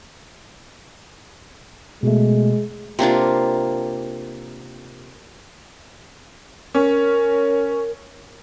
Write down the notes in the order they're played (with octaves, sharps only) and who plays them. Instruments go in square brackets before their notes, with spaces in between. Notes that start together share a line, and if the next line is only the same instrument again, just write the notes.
[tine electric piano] B2 A3 [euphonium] G#3
[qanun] C3 A#3 D4 F4
[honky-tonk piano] C#4 [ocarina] A#4